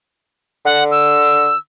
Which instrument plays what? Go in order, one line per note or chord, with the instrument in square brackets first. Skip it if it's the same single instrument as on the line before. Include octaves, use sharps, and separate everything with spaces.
[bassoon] D3 [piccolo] F#5
[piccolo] E6